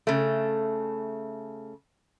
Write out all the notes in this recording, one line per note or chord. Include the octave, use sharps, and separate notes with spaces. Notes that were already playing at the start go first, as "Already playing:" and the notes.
C#3 A3